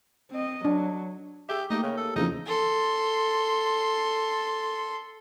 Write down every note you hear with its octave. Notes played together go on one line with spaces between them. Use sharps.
C4 D#5
F#3 D4
G4 G#4 E5
A3 A#3 D#4 G4
C#3
A4
E2 C#3 F3 D#4
A4 C6